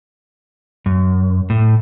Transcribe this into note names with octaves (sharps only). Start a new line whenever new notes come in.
F#2
A2